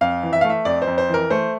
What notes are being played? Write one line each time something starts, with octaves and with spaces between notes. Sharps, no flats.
F2 F5
E3
E5
A3 F5
E5
F2 D5
C5
F2
C5
E3 A#4
A3 C5